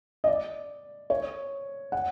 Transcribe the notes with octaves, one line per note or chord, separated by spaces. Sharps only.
D#5
D5
C#5
F#5